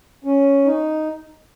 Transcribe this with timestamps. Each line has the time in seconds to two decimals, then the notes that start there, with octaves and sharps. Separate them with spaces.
0.24 C#4
0.65 D#4